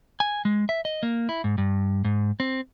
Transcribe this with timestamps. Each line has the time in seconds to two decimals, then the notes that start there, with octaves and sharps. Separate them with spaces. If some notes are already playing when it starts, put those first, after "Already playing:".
0.20 G#5
0.45 G#3
0.69 E5
0.85 D#5
1.03 A#3
1.29 E4
1.44 G#2
1.58 G2
2.05 G#2
2.40 C4